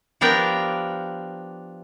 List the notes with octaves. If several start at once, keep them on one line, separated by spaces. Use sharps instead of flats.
F3 B3 D4 G4 A#4 G5